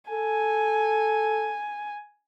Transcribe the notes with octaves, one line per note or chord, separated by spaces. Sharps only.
A4 G#5